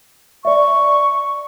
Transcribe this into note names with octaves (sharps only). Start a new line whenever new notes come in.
D5 E5 C#6